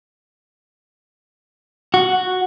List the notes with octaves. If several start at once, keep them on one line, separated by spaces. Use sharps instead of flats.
F#4